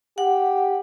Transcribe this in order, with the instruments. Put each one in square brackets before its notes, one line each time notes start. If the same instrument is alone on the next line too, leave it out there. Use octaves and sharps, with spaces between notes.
[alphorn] G4 [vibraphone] F#5